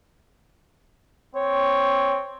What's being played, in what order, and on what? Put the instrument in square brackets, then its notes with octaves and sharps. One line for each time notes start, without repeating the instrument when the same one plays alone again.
[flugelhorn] C4 [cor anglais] C#5